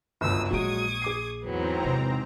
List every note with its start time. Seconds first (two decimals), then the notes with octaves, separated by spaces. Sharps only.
0.21 G1 C#2 F#2 D#6 E6
0.51 A#1 F#3 G#3 F4 C#6 D#6 G#6 D7
1.02 G#4 D6 C7
1.43 E2 G#2 F#3 B3 C4 A#5
1.84 C3